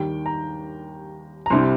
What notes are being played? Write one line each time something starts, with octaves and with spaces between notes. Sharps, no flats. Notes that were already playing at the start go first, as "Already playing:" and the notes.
Already playing: D#2 D#3 G3 G5
A#5
A#5
C2 C3 G3 C6